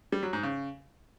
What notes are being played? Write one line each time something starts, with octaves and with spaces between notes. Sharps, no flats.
G3
F#3
G#2
C#3